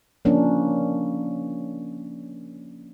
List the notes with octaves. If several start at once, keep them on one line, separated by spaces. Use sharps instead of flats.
F3 A#3 C#4 D4